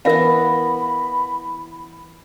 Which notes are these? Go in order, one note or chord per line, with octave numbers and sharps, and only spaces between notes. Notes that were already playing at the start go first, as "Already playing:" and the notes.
E3 B3 A#4 E5 F5 B5